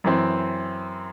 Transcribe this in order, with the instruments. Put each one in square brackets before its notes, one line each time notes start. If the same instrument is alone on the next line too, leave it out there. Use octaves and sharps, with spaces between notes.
[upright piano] F#2 E3 C4